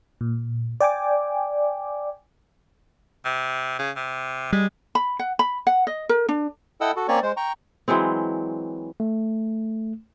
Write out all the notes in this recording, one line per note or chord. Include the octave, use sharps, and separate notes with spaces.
A#2
D5 G5 G#5 D6
C3
C#3
C3
G3 G#3
B5
F#5
B5
F#5
D#5
A#4
D4
E4 A4 D#5 F#5 G5 E6
F#4 A4
A#3 C4 C#4 C#5 D5 C#6
G#3 C5
G5 A#5 C#6
E3 F#3 G#3 C4
A3